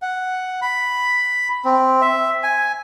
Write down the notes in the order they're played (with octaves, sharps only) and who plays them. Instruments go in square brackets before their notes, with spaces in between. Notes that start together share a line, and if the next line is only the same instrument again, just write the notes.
[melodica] F#5
B5
C4
E5
G#5